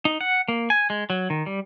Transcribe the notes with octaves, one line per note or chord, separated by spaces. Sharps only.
D#4
F#5
A#3
G#5
G#3
F#3
D#3
G3